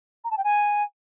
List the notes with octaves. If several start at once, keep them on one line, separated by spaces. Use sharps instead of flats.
A#5
A5
G5
G#5